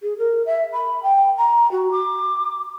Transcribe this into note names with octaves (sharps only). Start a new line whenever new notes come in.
G#4
A#4
E5
B5
G5
A#5
F#4
D6